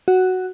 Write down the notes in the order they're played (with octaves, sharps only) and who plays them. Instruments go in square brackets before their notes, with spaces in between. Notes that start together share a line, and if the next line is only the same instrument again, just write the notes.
[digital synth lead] F#4